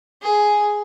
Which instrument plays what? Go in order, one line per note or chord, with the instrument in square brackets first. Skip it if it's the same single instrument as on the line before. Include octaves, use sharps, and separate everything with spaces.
[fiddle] G#4